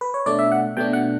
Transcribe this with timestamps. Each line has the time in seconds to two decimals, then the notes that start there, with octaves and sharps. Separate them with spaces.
0.01 B4
0.14 C#5
0.26 B2 A3 D4 D5
0.39 E5
0.52 F#5
0.77 B2 A3 D4 G5
0.93 F#5